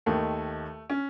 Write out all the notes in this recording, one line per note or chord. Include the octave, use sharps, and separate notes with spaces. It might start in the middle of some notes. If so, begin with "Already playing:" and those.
D#2 D#3 A3
C#4